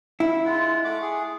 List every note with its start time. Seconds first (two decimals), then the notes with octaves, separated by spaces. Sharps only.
0.20 E4
0.45 G#3 F4 F#5
0.85 A3 F#5 D6
1.02 G#4